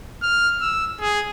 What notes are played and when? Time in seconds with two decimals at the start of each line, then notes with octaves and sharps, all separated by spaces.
0.23 F6
0.61 E6
1.00 G#4